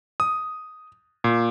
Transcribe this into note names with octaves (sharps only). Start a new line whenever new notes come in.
D#6
A#2